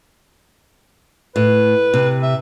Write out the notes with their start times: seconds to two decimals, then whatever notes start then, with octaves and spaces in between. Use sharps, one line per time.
1.36 A2 B4
1.94 C3
2.23 E5